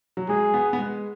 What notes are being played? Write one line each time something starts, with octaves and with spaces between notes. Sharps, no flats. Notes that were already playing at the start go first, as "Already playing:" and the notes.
F#3
G#3 G#4
B3
B3
G#3